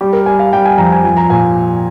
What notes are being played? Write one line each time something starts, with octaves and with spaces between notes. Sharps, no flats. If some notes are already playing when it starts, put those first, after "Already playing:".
G3 G4
A#4
G3 G#5
F5
G3 G5
G#5
F2 A#5
G#5
F3 G#5
A#5
A#2 G#5